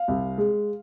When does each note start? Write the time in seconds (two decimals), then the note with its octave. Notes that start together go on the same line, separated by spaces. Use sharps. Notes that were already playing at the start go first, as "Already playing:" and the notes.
Already playing: F5
0.08 C2
0.38 G#3